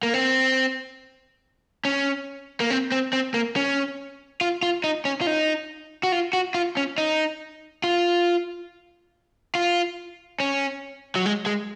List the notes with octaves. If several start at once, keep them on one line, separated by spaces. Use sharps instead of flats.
A#3
C4
C#4
A#3
C4
C4
C4
A#3
C#4
F4
F4
D#4
C#4
F4
D#4
F#4
F4
F#4
F4
C#4
D#4
F4
F4
C#4
F#3
G#3
G#3